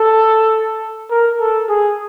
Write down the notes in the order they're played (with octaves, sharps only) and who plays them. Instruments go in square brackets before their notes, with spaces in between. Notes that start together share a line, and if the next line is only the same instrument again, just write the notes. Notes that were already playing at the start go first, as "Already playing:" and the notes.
Already playing: [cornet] A4
A#4
A4
G#4